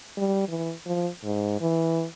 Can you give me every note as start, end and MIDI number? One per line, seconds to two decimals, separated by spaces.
0.17 0.47 55
0.48 0.73 52
0.86 1.09 53
1.24 1.58 44
1.61 2.06 52